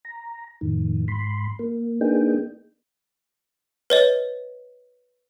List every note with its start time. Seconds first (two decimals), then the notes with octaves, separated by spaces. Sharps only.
0.05 A#5
0.61 F2 A2 D#3
1.08 G#2 B5 C6
1.59 A#3
2.01 A#3 B3 D4 D#4 G#4 G5
3.90 B4 C#5 D#5